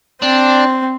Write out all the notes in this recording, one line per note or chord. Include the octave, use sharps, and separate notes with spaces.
C4 D4